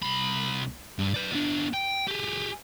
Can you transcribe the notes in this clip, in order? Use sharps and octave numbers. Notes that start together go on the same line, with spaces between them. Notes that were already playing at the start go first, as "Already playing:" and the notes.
C2 B5
G2
B4 D5
B3 D4
G5
G4 G#4